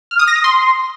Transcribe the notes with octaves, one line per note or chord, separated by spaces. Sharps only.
F6
D#6
A#6
D#6
C6